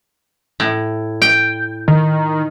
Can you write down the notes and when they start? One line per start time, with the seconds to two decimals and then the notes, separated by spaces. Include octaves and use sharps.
0.60 A2
1.22 G5
1.88 D#3